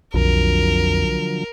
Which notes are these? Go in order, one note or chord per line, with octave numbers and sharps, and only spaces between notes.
B1 F2 D3 F3 F#3 A#4